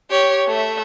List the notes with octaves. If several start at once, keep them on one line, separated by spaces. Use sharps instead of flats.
G4 C#5
A3 E5